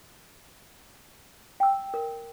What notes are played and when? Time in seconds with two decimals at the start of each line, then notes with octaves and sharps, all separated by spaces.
1.60 G5 E6
1.94 A#4